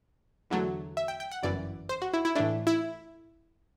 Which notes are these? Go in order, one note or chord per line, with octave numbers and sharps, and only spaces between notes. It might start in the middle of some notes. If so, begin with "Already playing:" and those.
E2 D3 F#3 A3
E5
G5
G5
F#5
G1 F#2 E3 D5
C5
F#4
E4
E4
A2 E3 A3 D4
E4